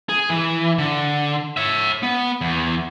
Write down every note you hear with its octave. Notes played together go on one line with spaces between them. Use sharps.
G#4
E3
D3
C#5 E5
B3
E2